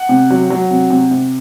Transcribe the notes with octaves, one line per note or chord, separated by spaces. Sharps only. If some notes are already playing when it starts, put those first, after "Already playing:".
Already playing: F#5
C3
F#3
F#3
C3
C3
C3